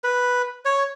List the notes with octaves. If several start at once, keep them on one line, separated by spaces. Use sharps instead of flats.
B4
C#5